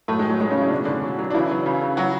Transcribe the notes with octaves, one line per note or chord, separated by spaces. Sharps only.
A2 F#3 A3
G#3
A2
F#3
F#3 G#3
C#3 C#4
F#3
E4
D4
B2 C#4
B2 D3 D4
F#3
F#3
D4
C#3 E3 E4
F#3
C#3
C#3
F#3 F#4